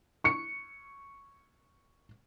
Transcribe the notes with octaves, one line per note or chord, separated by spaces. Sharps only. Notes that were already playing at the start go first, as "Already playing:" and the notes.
C#6 C#7